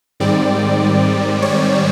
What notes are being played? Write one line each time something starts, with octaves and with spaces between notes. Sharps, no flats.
G#2 D#3 G3 C4 D5
C#5